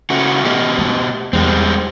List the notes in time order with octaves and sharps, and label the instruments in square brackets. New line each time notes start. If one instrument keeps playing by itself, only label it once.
[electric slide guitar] C#3 A3 F#4
B2 G4 D#5
[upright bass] A3
[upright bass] E2 [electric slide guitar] G3 G#3 C4